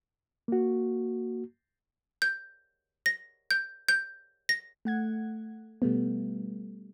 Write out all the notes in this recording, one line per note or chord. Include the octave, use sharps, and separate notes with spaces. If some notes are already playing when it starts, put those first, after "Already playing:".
A#3 F#4
G6
A#6
G6
G6
A#6
A3 F#5 G#6
B2 G3 A3 B3